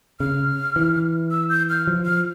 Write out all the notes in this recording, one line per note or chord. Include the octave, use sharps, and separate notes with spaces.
C#3 F6
E3
E6
G6
F6
F3
F6